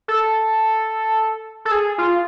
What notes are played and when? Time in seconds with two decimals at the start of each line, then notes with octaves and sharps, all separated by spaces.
0.08 A4
1.65 A4
1.71 G#4
1.98 F4